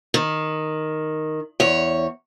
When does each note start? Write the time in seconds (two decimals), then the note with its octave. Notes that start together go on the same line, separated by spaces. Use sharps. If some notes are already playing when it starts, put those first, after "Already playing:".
0.14 D#3
1.60 E2 C#5